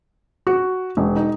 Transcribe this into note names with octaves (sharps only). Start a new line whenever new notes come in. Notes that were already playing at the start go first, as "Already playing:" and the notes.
F#4
E1
D#4